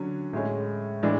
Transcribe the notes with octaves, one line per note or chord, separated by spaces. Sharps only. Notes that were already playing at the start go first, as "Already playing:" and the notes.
Already playing: D3 F#3 C#4
A2 G#3 C#4
A2 E3 G#3 D4